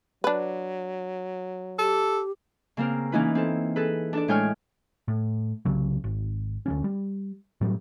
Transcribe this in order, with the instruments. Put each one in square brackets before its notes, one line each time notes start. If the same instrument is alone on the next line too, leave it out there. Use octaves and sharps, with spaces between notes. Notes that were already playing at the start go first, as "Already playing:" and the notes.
[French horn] F#3 [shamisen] D4 B4
[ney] G4 [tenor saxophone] A4
[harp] C#3 A#3 C4 A#4
E3 A#3 C#4 D#4 E4 B4
C4 A4
G#4 A4 B4
D4 A4 D5
A2 G#3 C#5 G5 G#5 F6
[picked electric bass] A2
C2 C#3 F#3
G#1
D2 G3 C#4
G3
A2 F#3 G3